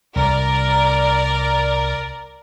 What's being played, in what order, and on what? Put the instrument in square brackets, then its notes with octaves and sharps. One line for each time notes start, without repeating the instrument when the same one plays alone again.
[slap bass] C2 [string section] A#4 D5